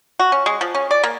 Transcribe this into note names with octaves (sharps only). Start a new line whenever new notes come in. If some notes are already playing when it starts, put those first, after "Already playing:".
F#4
C#4
G#3
F3
C#4
D5
A#3